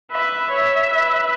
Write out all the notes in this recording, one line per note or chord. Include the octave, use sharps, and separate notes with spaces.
B4 E5
C#5
B4